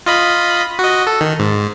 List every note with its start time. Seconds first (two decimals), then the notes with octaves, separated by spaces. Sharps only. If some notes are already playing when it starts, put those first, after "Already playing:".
0.06 F4 D#5 B5
0.79 F#4 D#5
1.07 A4
1.21 D#3
1.39 G#2